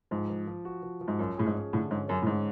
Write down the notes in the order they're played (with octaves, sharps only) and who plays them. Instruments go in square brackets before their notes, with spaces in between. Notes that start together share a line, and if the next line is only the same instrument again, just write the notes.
[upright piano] G#2 [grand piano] F3
[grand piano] F3
F3
F#4
F3
F3
[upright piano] G#2
[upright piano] F#2 [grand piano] C#4
[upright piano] A2 [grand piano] G#4
[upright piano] G#2
[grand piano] C#4
[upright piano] A2 [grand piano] D3
[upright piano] G#2 [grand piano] C#4
[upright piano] F#2 [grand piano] C#4
[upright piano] A2
G#2